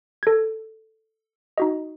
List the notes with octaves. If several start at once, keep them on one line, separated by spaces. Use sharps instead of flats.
A4 G#6
D#4 F#4 D#5